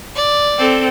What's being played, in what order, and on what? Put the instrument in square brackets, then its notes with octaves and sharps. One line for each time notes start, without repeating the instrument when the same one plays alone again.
[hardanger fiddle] D5
[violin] C4 A4